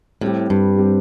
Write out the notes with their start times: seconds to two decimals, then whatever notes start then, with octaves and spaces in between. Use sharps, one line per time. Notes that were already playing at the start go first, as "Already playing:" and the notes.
0.21 A2 G3 C4 G4
0.50 G2
0.77 G3 C4 G4